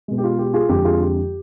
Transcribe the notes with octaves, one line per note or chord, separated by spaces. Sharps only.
B2 G#3
G4
F4
G4
F4 G#4
F2 D3 G#3 G4
F4 G#4
G4